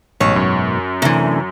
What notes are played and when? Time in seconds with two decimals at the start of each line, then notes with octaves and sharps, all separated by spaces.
0.20 A1 G#2 B2 F#3 C#5
0.36 F#2
1.02 C3 E3 A3 C#4 D4